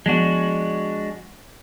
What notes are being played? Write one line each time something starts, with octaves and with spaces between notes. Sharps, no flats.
F3 G#3 B3 D4 F#4